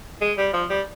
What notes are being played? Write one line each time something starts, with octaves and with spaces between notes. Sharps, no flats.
G#3
G3
F3
G3